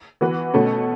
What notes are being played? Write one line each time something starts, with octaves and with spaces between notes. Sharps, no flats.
E3 B3 F#4 B4
B2 A3 C#4 F#4 A4